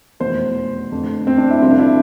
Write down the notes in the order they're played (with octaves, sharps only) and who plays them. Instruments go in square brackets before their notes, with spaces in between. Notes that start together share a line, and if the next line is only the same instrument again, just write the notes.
[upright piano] F1 E2 B2 C5
F1 F2 D3
C4
D4
E4
C2 C3 F3 C4
D4
E4